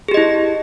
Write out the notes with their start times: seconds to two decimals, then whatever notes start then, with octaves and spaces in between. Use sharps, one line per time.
0.08 G#4
0.11 G4
0.14 D#5
0.17 E4